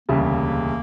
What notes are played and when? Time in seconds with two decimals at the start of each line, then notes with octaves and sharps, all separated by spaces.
0.09 E1 D2 C#3 G3 A#3